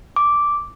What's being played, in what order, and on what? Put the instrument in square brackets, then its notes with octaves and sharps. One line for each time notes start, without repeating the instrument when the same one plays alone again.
[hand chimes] D6